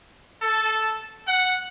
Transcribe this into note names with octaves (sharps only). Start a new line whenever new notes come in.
A4
F#5